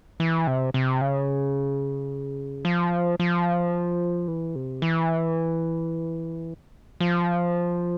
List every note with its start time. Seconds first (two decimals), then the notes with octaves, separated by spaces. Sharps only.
0.20 E3
0.47 C3
0.74 C3
1.01 C#3
2.65 F3
3.20 F3
4.28 E3
4.55 C3
4.82 E3
7.00 F3